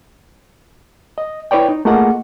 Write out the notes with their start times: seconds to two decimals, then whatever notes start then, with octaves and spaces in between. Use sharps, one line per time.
1.18 D#5
1.51 E4 B4 C#5 D5 G5
1.69 D#4
1.85 A3 A#3 F4 G#4 D#5 F#5